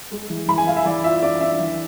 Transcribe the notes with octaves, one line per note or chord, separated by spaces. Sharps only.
G#3
E3
E3 B5
G#5
E4 F5
E5
E3 D5
F4 E5
D4 D5
D4 E5
E3